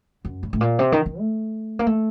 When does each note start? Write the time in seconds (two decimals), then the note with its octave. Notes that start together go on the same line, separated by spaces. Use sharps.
0.25 F#2
0.43 A2
0.53 A2
0.61 A#2
0.79 C3
0.92 D#3
1.06 D#3
1.19 A3
1.79 A#3
1.87 A3